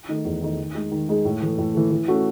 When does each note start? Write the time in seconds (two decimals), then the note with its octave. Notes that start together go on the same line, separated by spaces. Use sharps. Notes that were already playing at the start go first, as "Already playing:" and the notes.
0.08 D#3 A3 D#4
0.25 E2
0.41 D#3 A3 D#4
0.58 D#3
0.75 G#3 D#4 G#4
0.92 D#3
1.08 G#3 D#4 G#4
1.25 A2
1.42 E3 A3
1.58 A2
1.75 E3 A3
1.91 E3
2.08 A3 C#4 F#4